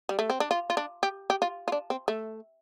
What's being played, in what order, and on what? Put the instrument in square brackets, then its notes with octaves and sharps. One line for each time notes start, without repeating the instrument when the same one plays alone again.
[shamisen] G3
A3
C4
D4
F4
F4
D4
G4
G4
F4
F4
D4
C4
A3